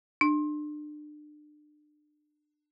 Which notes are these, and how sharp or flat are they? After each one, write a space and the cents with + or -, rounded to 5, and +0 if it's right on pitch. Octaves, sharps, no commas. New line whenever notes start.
D4 +30